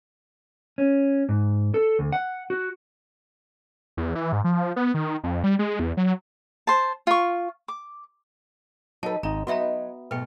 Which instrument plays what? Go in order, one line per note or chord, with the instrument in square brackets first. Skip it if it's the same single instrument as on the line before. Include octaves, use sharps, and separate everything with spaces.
[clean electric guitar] C#4
G#2
A4
D2
F#5
F#4
[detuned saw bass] E2
E3
G#2
F3
B3
D#3
F2
G3
G#3
E2
F#3
[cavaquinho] C5 A5
F4 C#6
D6
[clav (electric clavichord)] F#3 A4 [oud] D#4 B4 [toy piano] A5
[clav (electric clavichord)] G#1 D#4 [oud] G#3 [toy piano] A#5
[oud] F#3 D#4 B4 [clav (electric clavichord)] B3 [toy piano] F#4 E5 A#5
[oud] G#2 B2 A3 [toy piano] B4 G5